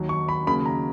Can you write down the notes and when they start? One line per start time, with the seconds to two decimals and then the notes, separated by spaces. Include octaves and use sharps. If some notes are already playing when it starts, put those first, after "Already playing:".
Already playing: D#2 D#3 F#3
0.09 C#6
0.29 B5
0.47 D#2 C#3 F#3 A#3 B5
0.66 A#5